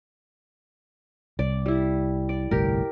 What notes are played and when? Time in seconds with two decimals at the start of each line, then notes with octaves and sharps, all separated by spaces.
1.39 C2 D5
1.66 G3 E4
2.29 D5
2.51 G1 C2 A2 G4 A#4